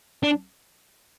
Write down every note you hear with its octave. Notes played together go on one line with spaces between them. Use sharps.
D4